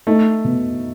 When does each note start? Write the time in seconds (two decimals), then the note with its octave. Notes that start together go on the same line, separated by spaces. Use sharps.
0.07 A3 D#4
0.45 B2